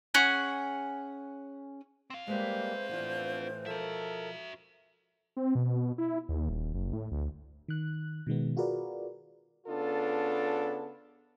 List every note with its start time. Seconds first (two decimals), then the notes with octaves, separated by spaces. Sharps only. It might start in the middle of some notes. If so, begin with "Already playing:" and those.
0.14 C#4 G#4 F#5
2.10 C4 F5
2.27 G3 G#3 A#3 B4 C5 E5
2.89 A2 E3 B3 D4 F4
3.66 B2 F3 F#4 A4 A#4 E5
5.37 C4
5.55 B2
5.98 E4
6.29 D#2
6.49 D#1
6.74 F#1
6.93 A2
7.11 D2
7.68 D#3 F#6
8.27 B2 D#3 G#3 B3
8.57 F4 F#4 G#4 A#4 B4 D5
9.67 C#3 B3 D4 F4 A4